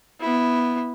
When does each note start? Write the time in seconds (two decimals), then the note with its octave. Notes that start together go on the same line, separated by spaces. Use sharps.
0.20 B3 E4